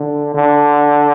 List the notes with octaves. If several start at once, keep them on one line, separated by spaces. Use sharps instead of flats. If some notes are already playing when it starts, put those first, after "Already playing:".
Already playing: D3
D3